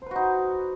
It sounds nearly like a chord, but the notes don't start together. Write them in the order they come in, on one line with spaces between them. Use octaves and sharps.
C5 B4 F#4 D#4